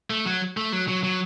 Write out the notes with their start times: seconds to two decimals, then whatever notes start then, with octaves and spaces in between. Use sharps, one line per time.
0.10 A3
0.26 F#3
0.57 A3
0.72 F#3
0.88 F#3
1.04 F#3